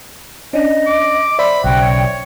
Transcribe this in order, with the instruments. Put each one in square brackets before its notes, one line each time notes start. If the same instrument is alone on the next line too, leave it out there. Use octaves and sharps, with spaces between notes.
[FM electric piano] C#4 D4 [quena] D#5
[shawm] D6
[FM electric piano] C5 D5 E5 [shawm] B5
[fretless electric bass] B1 C#3 [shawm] F#4 [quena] G5
[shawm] C#5